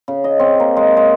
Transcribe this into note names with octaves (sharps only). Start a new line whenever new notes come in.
C#3
D#5
C4
A#3
G#3
G#3